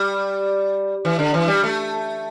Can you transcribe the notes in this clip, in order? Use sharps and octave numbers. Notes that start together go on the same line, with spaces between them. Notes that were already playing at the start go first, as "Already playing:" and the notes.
Already playing: G3
E3
D3
E3
G3
A3